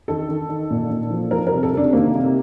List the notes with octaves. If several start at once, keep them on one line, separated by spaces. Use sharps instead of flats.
D#3 A4
D#3
D#3
A#2
A#2
F3
F3 A#4
C3 A#4
A4
C3 D4
D#3 A#3
C3